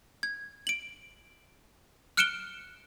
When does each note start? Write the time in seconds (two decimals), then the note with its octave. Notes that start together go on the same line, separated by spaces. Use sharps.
0.23 G#6
0.67 D7 F#7
2.17 F6 F#6 C#7 D7 E7 G7